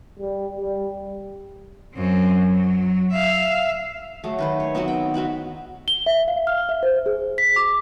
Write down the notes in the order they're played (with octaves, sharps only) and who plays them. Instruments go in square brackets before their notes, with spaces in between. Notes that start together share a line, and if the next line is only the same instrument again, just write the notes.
[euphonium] G3
G3
[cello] F#2 C4
F#3
E5 F5
[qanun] F#3 A3
D#3 B4 C5
C#5
F#3 B3 C4 D#4
G5
C4 F#4 F#5 B5
[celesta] G7
E5
F5
F6
E5
C5
G#4
B6
D6